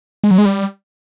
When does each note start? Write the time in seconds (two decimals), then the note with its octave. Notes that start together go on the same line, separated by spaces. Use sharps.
0.24 G#3
0.31 F#3
0.38 G#3
0.45 G3